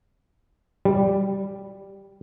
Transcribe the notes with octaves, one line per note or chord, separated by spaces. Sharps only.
G3